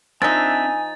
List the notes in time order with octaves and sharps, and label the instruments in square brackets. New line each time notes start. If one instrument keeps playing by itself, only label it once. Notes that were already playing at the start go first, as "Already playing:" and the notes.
[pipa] F3 D#4 [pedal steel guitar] C4 D4 E5 [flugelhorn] G#5 [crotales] A6